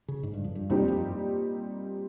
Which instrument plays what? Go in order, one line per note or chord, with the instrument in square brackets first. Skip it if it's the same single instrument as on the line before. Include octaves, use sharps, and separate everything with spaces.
[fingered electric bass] C#3
G#2
G2
F2
G2
[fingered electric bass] F2 [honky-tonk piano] A#2 G3 C4 D#4 G4
[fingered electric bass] F2
G2